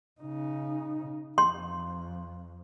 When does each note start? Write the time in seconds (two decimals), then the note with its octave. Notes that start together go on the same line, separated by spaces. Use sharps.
0.21 C#3 D#4
1.38 F2 C6